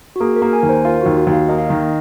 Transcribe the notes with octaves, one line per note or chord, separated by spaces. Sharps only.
F#4
A#3 G#4
A#4
A#3
G#5
D#2
C5
F4 A#4
F#4
D#2
F#4
D#2
F5
A#3 D#5
F5
D#3 D#5